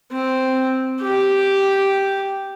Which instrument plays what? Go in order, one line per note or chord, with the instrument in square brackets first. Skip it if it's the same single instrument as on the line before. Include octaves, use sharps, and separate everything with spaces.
[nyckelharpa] C4
G4